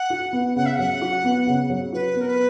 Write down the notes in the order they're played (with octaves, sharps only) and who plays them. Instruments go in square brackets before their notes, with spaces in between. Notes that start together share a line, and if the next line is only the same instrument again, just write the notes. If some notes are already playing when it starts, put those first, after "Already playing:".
Already playing: [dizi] F#5
[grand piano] F#4
B3
[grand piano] C#3 [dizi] F#5
[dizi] E5
[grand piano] F#3 [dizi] F#5
[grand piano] F#4
B3
C#3
F#3
[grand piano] F#4 [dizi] B4
[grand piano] B3 [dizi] A#4
[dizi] B4